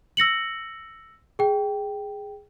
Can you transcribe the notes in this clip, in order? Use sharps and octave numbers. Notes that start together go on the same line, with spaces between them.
E6 A#6 C#7 F#7
G#4 G5